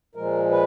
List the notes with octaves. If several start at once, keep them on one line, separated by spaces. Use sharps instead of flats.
A#2 F3 G#3 A#4
B4